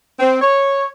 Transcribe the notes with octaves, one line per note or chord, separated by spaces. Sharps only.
C4
C#5